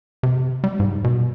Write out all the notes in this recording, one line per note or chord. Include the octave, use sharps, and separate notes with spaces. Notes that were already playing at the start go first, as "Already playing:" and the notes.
C3
G3
G#2
B2